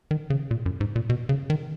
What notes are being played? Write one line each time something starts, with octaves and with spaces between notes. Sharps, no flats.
D#3
C#3
A#2
F#2
G#2
A#2
B2
C#3
D#3